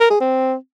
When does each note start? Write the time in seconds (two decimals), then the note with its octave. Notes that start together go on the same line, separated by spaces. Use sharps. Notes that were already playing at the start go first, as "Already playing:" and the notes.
0.01 A#4
0.11 G#4
0.21 C4